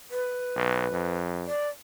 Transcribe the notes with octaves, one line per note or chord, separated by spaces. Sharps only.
B4
B1
F2
D5